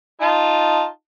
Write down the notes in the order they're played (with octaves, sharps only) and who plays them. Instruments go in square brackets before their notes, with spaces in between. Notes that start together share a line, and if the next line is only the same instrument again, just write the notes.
[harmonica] D#4 F4 A5